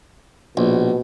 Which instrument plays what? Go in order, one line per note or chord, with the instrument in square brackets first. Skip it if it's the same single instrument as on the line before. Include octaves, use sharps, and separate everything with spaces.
[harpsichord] A#1 [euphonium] B2